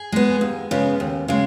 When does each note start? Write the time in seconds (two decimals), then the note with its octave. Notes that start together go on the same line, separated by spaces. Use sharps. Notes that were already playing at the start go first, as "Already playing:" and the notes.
Already playing: G#4
0.12 G#3 B3
0.41 D#2
0.71 C#3 G#3 B3
1.00 D#2
1.28 C#3 G#3